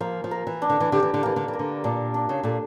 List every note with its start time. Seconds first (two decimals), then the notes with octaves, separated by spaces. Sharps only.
0.01 F3 A#3
0.24 F3
0.31 A#4
0.47 E3
0.62 D4
0.70 D3
0.80 E3
0.92 D3 G4
1.03 E3
1.14 D3
1.23 E3 A#3
1.36 D3
1.48 E3
1.53 A#4
1.59 D3
1.84 A#2 D4
2.14 D4
2.29 C#3
2.43 A#2 A4